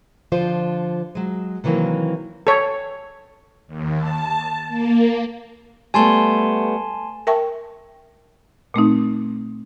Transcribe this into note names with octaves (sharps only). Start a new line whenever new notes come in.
D3 F3 F4 C5
F#3 G#3
C3 D#3 E3 F#3 A#3
A4 C#5
D#2
A5
A#3
G3 A3 B3 G#5 A5 C6
A#4 E5 G5 A5 C#6
A#2 A3 C4 D#4